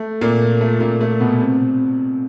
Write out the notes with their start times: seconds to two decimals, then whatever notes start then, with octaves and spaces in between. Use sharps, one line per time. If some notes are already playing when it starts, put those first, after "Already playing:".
Already playing: A3
0.21 A#2 A#3
0.61 A3
0.80 A#2 A#3
1.01 A3
1.20 B2 B3
1.40 C3 C4